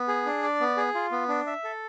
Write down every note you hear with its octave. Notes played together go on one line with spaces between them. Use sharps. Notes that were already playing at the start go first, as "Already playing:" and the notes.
Already playing: B3
G#4
D4
D5
B3
G#4
F4
B3
D4
E5
A4